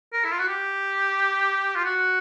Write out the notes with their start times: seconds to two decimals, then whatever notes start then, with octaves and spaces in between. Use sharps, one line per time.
0.13 A#4
0.25 E4
0.32 F4
0.40 F#4
0.48 G4
1.76 F4
1.85 F#4